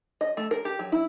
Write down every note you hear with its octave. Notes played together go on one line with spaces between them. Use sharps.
D#5
A3
A#4
G4
F#3
E4